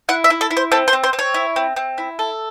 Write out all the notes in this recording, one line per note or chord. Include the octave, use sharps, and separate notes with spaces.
E4 F#5
E5
E4
A4
E4
C5
C4 A4
C5
C4
C5
C4
C#5
E4
C4
C4
E4
A4